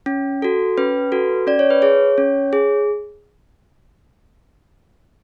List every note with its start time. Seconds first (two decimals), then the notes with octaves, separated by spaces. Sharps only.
0.06 C#4
0.42 F#4 A4
0.78 C#4 B4
1.12 F#4 A4
1.47 C#4 D5
1.59 C#5
1.70 B4
1.82 G#4 C#5
2.18 C#4
2.53 G#4